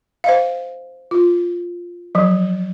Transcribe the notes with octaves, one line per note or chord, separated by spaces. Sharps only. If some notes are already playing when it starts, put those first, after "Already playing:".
C5 D#5 F5
F4
F3 F#3